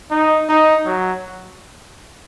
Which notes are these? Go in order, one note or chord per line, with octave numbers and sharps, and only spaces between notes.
D#4
D#4
F#3